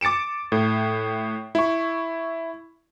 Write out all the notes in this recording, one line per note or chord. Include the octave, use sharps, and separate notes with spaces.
D6 A6 C#7 D7 E7
A2
E4 C#6